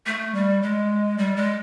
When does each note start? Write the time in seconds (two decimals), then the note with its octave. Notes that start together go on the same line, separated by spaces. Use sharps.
0.06 A3
0.35 G3
0.62 G#3
1.18 G3
1.36 G#3